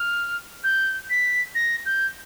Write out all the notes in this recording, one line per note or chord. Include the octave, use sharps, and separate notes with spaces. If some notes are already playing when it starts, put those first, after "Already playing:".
Already playing: F6
G6
B6
A#6
G6